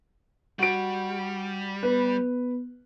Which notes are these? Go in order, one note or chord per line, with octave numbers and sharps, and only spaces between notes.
G3 F#4 D7
B3 B4